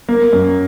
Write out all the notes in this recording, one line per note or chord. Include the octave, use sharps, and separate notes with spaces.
A#3
F#2